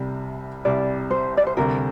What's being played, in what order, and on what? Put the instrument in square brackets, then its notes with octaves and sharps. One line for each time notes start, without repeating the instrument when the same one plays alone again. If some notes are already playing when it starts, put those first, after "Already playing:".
Already playing: [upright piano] C2 C3 G3
[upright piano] C2 C3 G3 [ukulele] D5
[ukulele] C5
D5
C5
[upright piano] D2 C3 G3 [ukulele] A#4